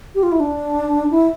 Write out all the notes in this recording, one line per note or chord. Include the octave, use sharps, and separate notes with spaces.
G4
F4
E4
D4
E4